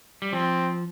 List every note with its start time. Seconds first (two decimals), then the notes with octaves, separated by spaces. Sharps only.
0.22 G3
0.33 F3 C4